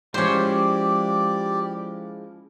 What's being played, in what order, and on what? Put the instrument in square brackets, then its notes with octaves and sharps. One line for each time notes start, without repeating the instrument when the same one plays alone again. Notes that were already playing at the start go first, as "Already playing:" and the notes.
[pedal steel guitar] F3 G#3 E4 [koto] C#4 C5 [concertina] G4 D5